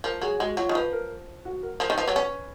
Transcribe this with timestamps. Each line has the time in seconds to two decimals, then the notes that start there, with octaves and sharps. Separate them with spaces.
0.04 F3 A#4
0.22 F#3 G#4
0.40 G#3 F#4
0.57 F#3 F4
0.69 D#3
0.75 F3 B4
0.93 A#4
1.45 F#4
1.63 A#4
1.80 F3 A#4
1.90 D#3
1.98 F3 B4
2.08 F#3
2.16 C#4